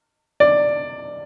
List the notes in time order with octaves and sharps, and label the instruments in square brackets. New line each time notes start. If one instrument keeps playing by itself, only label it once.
[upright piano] D5